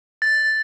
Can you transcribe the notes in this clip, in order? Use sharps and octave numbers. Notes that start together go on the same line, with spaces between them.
A6